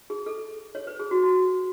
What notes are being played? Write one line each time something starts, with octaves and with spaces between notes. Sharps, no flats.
G#4
A4
C#5
B4
G#4
F#4
F#4